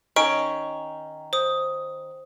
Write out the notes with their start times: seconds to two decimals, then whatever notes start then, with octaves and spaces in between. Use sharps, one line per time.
0.16 D#3 C#4 C#6 D7
1.33 C5 D#6